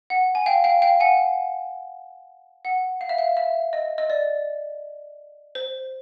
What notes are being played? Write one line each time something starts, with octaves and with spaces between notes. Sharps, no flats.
F#5
G#5
F5 G5
F5 G5
F5 G5
F#5 G#5
F#5
F5
E5
F5
E5
D#5
D#5
D5
C5